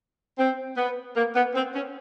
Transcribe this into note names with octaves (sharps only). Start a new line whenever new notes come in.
C4
B3
A#3
B3
C4
C#4